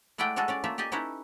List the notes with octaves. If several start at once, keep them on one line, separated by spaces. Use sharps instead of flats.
G#3 A3 E4 D5 F#5 G5
G3 G#3 F#4 G#4 A4
C#4 C#5 D5
A3 A#3 F4 E5
G4 D5 D#5 G#5
C#4 D#4 E4 A4 B4 C#5